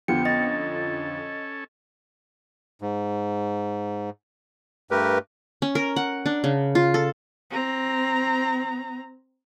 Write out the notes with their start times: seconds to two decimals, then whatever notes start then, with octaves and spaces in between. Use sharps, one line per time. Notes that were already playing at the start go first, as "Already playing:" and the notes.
0.08 F2 D3 F3 B3 G4 G5 C#7
0.25 C#4 A4 D#5 A6
2.82 G#2
4.91 G2 A3 G4 A#4 B4
5.62 C#4
5.75 A#4
5.96 F#5
6.26 D4
6.44 C#3
6.75 F4
6.94 A4
7.50 C4 A#5